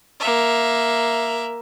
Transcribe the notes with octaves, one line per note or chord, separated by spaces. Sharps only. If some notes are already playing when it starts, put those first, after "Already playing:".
A#3 E5